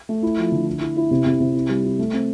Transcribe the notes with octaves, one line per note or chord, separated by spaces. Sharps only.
A3
E4
F3
D3
E4
E4
E4
C3
C3
C3
E4
G3
E4
A3
C4